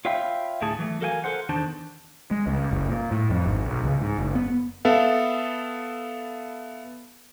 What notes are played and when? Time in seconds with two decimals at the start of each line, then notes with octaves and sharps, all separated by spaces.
0.05 F4 C#5 E5 F5 G5 B5
0.61 D2 A2 A3 E4 G#4 A5
0.79 E3 F#3 A3
1.01 F#4 A4 A#4 F5 G5 G#5
1.24 A4 A#4 C5 F#5
1.49 E2 D#3 D4 C5 A5
2.31 G#3
2.47 C#2
2.71 F#1
2.88 A#2
3.12 A2
3.30 F2
3.46 G#1
3.65 B1
3.84 C#2
4.02 G#2
4.19 F#1
4.35 B3
4.85 B3 A4 E5 F5